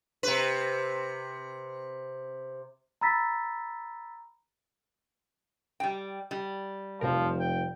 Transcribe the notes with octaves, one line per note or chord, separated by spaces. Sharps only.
C3 B4
A#5 B5 E6 A6 B6
G3 G5
G3
F1 F#2 C3 F3 A#4
G5